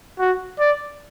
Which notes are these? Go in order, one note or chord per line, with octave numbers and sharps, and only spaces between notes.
F#4
D5